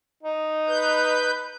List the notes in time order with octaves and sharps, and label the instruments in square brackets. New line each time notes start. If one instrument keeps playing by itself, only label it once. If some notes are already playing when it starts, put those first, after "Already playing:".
[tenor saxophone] D#4
[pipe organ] B4 G6